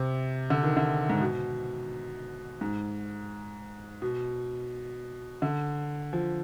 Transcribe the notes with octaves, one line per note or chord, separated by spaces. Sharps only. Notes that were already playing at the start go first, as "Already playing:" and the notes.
Already playing: C3
D3
D#3
D3
G#2
B2
G#2
B2
D3
F3